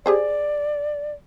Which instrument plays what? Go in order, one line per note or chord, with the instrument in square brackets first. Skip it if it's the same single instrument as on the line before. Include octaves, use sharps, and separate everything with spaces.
[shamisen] G4 G#4 C5 [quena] D5